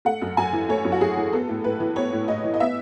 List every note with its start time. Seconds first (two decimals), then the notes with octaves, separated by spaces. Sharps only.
0.05 A3 F#5
0.22 F#2
0.37 F#2 G#5
0.53 E3
0.69 A3 C#5
0.85 F#2
0.92 F#4
1.01 F#2 G#4
1.17 E3
1.33 B3 A4
1.49 A2
1.64 A2 B4
1.80 E3
1.96 B3 C#5
2.13 A2
2.28 A2 D#5
2.44 E3
2.54 D#5
2.60 B3 E5